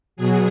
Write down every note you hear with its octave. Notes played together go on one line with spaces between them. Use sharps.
B2 F#3 G#4